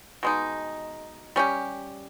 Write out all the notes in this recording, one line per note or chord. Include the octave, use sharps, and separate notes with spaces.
B2 G#3 D#4
G3 C#4 G4